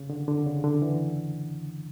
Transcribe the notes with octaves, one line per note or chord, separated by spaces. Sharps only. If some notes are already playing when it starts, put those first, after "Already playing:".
Already playing: C#3
D3
D3
C#3
D3
E3